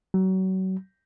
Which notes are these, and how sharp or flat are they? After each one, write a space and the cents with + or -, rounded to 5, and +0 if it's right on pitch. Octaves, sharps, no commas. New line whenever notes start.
F#3 +30